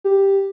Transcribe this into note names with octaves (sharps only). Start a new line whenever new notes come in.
G4